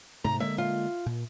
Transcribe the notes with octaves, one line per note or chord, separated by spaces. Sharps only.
G#2 C3 A3 A#5
D3 G#3 A#3 E5
F4
A#2